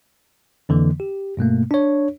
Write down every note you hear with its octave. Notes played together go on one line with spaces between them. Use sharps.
F2 D3 E3 A#3
G4
G2 B2 A3 A#3
D4 C#5